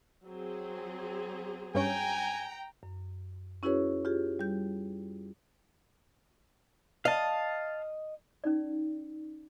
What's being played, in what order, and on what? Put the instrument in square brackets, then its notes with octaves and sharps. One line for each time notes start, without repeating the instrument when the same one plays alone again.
[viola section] F#3 C4 G#4
[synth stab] G2 C#4 [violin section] G5 A#5 [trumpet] G#5
[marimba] F#2
C#4 E4 F#4 G#4 B4 C#5
F4 G4 G#4
G3 G6
[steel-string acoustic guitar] D#5 [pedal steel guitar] F5 A5
[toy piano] C#4 D#4 D5